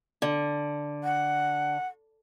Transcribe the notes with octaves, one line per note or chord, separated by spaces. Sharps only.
D3
F#5